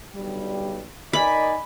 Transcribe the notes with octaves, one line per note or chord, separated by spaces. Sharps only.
B1 D3 G3
D#4 A#4 D5 D#5 G#5 B5